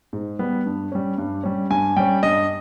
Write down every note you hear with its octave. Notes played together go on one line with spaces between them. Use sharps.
G#2
G3 B3
G2
G3 C#4
G2
G3 C#4
G2 G#5
G3 C#4 G5
G2 D#5